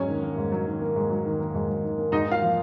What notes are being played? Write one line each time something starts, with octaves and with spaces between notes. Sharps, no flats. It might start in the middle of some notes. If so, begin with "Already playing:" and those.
Already playing: G#2 F#3 C#4 C#5
D#3
A#3
G#2
F#3
D#3
A#3
G#2
F#3
D#3
A#3
G#2
F#3
D#3
A#3
G#2 D#4 D#5
A#3 F4 F5
F3